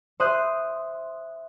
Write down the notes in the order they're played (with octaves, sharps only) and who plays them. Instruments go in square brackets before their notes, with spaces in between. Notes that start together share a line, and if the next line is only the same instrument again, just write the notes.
[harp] C5 E5 C6 D#6 F#6 G6